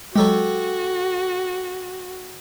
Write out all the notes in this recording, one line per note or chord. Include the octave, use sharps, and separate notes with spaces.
F#3 G#3 F#4 G4 A4 C#5